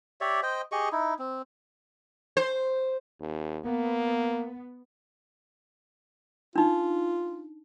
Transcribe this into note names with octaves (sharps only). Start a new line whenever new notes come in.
G4 C#5 D5 E5
C5 D#5 G5
G4 G#4 D#5 C#6
D#4 E4
C4
C5
D#2
A#3 B3
D4 D#4 F4